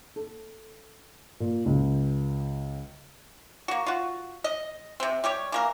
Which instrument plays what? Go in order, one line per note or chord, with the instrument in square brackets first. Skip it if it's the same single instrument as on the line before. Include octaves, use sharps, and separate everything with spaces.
[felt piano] A4
A#2
C#2
[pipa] A#3 F#4
F4 F#4
D#5
C3 C4
G3 G4 C#5
E3 A#3 A#4